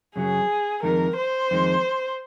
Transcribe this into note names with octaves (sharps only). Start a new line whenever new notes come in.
F#2 C#3 F#3 G#4
F2 D#3 G#3 A#4
C5
F2 D#3 G#3